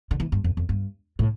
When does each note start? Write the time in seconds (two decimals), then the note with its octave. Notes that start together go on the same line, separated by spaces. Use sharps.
0.11 D3
0.20 E3
0.32 G2
0.44 F2
0.57 F2
0.69 G2
1.19 A2